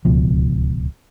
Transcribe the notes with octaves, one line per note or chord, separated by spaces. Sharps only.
D1 C#2 B2 F3